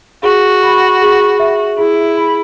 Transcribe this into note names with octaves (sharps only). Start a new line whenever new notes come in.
F#4 G#4
B5
G#4
E5
E4 G#4
B5